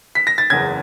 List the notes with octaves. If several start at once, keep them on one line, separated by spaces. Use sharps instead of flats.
B6
A#6
A6
F#1 E2 C#3 G#6